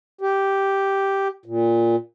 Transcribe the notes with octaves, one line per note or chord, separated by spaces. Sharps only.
G4
A#2